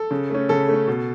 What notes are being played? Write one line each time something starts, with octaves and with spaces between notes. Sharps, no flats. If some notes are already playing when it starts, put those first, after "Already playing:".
Already playing: A4
C#3
A3 C#4
C#3 A4
A3 C#4
B2